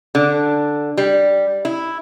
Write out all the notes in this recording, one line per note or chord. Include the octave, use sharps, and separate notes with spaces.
D3
G3
E4